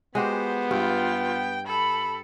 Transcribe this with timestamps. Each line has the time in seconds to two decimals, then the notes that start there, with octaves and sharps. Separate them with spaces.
0.15 G#3 B3 F#4 G4 C5
0.71 G2 F4 G5
1.67 A4 B5